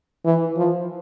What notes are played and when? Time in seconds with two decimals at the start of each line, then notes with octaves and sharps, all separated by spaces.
0.25 E3
0.57 F3